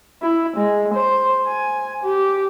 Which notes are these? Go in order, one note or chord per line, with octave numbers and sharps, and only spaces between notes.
E4
G#3
C5
G#5
G4